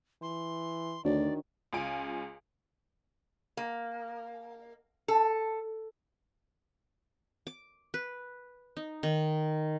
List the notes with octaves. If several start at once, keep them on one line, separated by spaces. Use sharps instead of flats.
E3 C6
D2 D#3 D4 F#4 C#5 D5
C#2 C#3 F4 G#5 D7
A#3
A4
D6
B4
D#4
D#3